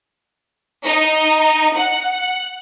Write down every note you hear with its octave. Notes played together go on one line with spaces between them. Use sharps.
D#4
F#5